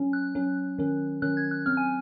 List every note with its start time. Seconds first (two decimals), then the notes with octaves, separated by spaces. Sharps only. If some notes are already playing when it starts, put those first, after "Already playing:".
Already playing: F#3 C#4
0.13 F#6
0.35 F#3 C#4
0.78 D#3 F#3 C#4
1.22 D#3 F#3 C#4 F#6
1.37 G#6
1.51 F#6
1.66 F#3 C4 F6
1.77 G#5